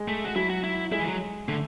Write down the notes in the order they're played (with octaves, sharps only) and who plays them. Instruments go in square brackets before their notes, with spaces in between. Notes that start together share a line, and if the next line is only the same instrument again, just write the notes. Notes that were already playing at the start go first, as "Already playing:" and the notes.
Already playing: [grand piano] G#3
[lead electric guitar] A3
F#4
[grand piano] F#3 [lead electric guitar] E4
[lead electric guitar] F#4
E4
[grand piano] G#3 [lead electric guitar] E4
[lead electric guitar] E3
F#3
[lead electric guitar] D3 [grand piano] A3